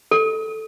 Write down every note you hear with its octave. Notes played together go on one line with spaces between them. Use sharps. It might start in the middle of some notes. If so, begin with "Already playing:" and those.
A4